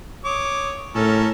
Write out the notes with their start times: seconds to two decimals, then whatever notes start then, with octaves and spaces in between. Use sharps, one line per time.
0.24 C#5 D6 D#6
0.95 A2 C#4 A4 A#4